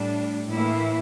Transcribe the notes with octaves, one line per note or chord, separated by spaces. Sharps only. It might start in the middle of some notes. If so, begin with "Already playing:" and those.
Already playing: A2 G3 D4
A2 E3 A#3 E4